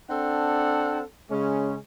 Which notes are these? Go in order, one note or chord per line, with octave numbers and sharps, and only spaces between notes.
C4 D4 A4 F#5
C#3 G#3 C#4